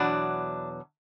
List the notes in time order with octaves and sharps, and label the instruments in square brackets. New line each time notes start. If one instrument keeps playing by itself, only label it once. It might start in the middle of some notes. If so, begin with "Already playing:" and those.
Already playing: [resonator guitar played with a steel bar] E2 B2 F#3 D4